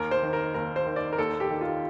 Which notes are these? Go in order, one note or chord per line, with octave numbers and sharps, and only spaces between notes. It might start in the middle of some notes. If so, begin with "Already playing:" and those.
Already playing: D#2 A#4
C5
D#3
A#4
D#2 A#4
C5
D#3
D5
A#4
D#2 A4
G4
D#3
F4